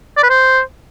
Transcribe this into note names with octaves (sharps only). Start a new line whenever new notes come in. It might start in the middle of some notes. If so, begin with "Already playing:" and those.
D5
B4
C5